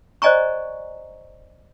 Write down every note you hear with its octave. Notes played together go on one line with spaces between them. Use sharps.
C5 D5 D#5 G#5 A#5 C#6